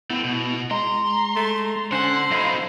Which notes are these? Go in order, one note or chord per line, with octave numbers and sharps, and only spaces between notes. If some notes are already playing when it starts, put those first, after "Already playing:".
A3 B3 C4 E4
B2
G#3 A#5 C6
A3
D3 C#4 C5 F#5
F#3 D#4 E4 A4 D#5 F5